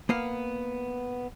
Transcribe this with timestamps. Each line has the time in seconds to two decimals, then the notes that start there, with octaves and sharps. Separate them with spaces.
0.09 A#3 B3 F5